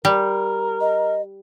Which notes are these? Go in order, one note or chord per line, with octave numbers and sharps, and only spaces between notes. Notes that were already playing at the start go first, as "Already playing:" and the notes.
G3 A#4
D#5